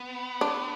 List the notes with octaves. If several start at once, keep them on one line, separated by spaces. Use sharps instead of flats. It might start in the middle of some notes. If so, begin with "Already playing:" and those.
Already playing: B3
D4